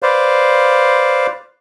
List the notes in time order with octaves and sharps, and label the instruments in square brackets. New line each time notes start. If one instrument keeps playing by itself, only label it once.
[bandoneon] B4 C5 D5 F5